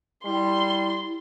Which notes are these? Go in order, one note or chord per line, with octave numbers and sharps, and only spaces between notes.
G3 E4 C6